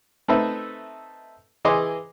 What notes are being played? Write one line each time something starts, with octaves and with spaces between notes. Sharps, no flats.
A3 C4 D#4 B4 E5
E3 G#4 D#5 C6 D6